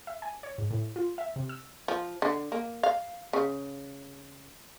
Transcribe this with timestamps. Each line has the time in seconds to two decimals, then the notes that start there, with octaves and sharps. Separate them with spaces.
0.07 E5
0.22 G#5
0.43 C#5
0.58 G#2
0.71 A2
0.96 F4
1.18 E5
1.36 C3
1.49 E6
1.88 F3
2.22 D3
2.52 A#3
2.83 F5
3.33 C#3